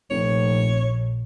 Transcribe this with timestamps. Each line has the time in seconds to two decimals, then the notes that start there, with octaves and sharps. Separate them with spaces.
0.11 F1 A#1 C#5